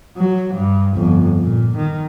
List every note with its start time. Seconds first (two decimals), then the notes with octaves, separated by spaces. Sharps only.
0.17 F#3
0.55 G2
0.96 G1 F2
1.43 A#2
1.77 D#3